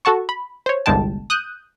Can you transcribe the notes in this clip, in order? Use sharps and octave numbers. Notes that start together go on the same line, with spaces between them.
F#4 A4 F#5 A5 C#6
B5
C5 C#5
G1 C2 G2 G#3 G5 A5
D#6 F#6 G6 D#7